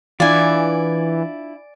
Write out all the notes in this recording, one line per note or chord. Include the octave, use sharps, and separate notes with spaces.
E3 D4 E4 F4 D5 G#5